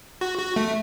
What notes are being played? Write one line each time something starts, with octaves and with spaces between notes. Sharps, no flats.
F#4
F#4
A3